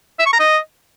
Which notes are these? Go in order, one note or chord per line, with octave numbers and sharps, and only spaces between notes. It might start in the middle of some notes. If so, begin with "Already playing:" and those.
E5
C#6
A#5
D#5